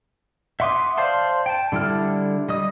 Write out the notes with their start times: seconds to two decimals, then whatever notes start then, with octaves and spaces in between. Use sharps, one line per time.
0.60 E5 F#5 C6 D6 D#6
0.97 C5 D5 F5 A5 C6
1.46 G5 A5
1.72 D3 G3 E4 A4 F6
2.49 G3 D#5 D#6